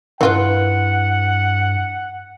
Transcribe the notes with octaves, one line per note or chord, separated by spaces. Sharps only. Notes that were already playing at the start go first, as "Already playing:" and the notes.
G2 E3 F4 B4 F#5